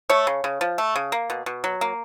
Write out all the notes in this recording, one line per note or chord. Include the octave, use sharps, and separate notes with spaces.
A3 C#5
C#3
C#3
F3
A3
C#3
A#3
B2
B2
F#3
A#3